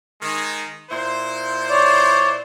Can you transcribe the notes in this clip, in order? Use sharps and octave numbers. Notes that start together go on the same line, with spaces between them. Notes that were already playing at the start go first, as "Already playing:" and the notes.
D#3 G#3
A#2 E4 C5
C#5 D5